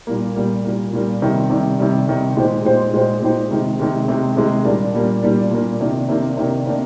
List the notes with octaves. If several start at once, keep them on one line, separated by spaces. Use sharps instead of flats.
A#2 G3 A#3
A#2 G3 A#3
A#2 G3 A#3
A#2 G3 A#3
C3 D#3 G3
C3 D#3 G3
C3 D#3 G3
C3 D#3 G3
A#2 G#3 D#4 G4 C5
A#2 G#3 D#4 G4 C5
A#2 G#3 D#4 G4 C5
A#2 G#3 D#4 G4 C5
C3 D#3 G#3
C3 D#3 G#3
C3 D#3 G#3
C3 D#3 G#3
A#2 G3 A#3 D4
A#2 G3 A#3 D4
A#2 G3 A#3 D4
A#2 G3 A#3 D4
C3 D#3 A#3 D4
C3 D#3 A#3 D4
C3 D#3 A#3 D4
C3 D#3 A#3 D4